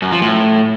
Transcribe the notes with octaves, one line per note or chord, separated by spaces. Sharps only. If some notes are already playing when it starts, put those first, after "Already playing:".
F#2
F3
A2